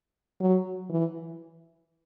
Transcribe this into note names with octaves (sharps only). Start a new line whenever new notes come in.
F#3
E3